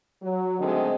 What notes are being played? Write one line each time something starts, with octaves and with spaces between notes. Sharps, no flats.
F#3
B2 D3 D#3 G#3 A3 C4